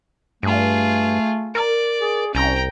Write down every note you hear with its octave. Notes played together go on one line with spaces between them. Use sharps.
G2 A3 F4 G#4
A#4 D5
G#4
C2 C#4 G5 A#5